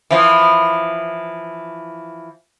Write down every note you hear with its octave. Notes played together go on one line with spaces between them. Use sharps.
E3 F3